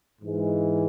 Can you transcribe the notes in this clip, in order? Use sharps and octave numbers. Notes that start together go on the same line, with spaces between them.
G#2 E3 G#3